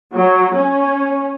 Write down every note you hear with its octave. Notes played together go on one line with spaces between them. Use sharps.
F#3
C#4